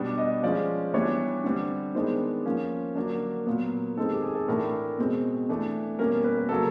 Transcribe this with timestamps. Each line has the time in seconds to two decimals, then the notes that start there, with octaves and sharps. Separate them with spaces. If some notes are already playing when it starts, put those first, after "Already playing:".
Already playing: B2 G3 B3 D4
0.18 D#5
0.43 F3 G#3 C#4 D5
0.94 E3 G3 B3 D4 C#5
1.44 D3 G3 C4
1.95 D#3 G#3 B3 D4 C5
2.46 F3 A#3 C#4
2.95 D3 F#3 A#3 D4
3.46 A#2 F#3 B3
3.97 D#3 G#3 C4 A4
4.11 G4
4.22 G#4
4.35 A4
4.48 A2 E3 A3 D4 A#4
4.98 B2 G#3 C4
5.49 E3 A3 D4
5.99 B2 G3 A#3 C#4 A#4
6.24 B4
6.37 A#4
6.49 C#3 F#3 A#3 C#4 A4